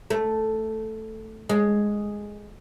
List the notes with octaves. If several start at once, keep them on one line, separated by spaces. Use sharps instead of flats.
A3
G#3